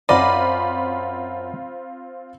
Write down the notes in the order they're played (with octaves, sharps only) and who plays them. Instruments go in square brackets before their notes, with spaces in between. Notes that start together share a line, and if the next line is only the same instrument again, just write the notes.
[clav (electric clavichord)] F#2 D#5 [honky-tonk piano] C4 F4 B5 [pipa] D5